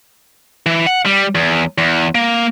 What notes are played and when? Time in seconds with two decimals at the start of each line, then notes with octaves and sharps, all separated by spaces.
0.66 E3
0.86 F#5
1.06 G3
1.35 E2
1.78 E2
2.15 A#3